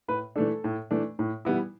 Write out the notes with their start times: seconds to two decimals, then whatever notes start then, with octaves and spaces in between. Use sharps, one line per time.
0.08 A2 B4
0.36 E3 A3 D4 A4
0.64 A2
0.91 E3 A3 D4
1.19 A2
1.45 E3 G3 B3 E4